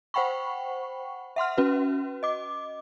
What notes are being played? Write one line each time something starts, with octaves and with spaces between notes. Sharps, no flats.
C5 F#5 G5 B5 C#6
E5 F#5 C6 F6
C#4 F#4 B4
D#5 D6